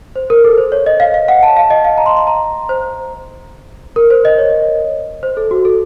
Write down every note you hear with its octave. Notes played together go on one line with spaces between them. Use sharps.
C5
A#4
A4
C5
C#5
D#5
F5
F5
F#5
A5
F5
D#5
F5
A#5
C6
C6
A#5
C5
A#4
C5
D#5
C#5
C5
A4
F#4
A4